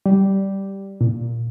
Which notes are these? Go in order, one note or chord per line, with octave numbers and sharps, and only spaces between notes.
G3
A#2